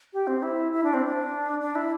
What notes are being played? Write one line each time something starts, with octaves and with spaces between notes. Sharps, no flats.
G4
C4
E4
E4
D4
C4
D4
D4
E4